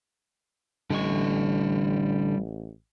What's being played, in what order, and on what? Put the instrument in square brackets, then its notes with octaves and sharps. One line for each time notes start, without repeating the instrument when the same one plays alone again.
[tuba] A1 [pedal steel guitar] D3 C#6 [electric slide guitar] G3 D#5